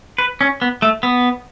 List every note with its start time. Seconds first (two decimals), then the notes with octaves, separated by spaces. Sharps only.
0.18 B4
0.41 C#4
0.62 B3
0.82 A3
1.03 B3